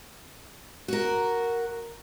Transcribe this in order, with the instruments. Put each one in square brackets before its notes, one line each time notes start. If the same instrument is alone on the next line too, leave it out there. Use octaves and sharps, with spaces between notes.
[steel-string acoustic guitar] F#4 A#4